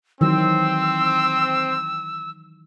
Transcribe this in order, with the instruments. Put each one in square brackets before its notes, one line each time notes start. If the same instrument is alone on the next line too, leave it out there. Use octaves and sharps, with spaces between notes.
[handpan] D#3 E3 F#3 [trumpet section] C4 [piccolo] E6